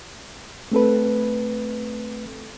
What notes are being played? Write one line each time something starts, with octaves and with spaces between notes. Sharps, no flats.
A3 C4 A4 B4